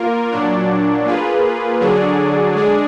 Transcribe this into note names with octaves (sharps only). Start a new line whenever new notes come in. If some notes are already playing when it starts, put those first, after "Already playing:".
Already playing: A#3 F4 A#4
A#2 F#3 D4
A#3 F4 G#4 B4
D3 F#3 D4 G#4
G#3 D4 G#4